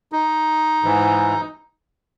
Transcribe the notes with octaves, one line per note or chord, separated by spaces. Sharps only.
D#4
G#2 E3